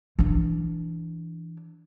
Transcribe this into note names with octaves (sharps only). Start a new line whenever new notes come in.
E3 D4